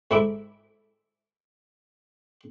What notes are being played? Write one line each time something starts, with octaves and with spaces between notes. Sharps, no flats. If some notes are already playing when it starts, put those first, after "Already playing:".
G#2 E4 A4 E5 B5 D6